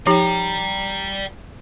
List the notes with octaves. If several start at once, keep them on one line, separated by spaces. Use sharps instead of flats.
F3 D#4 G4 D5 G5 A#5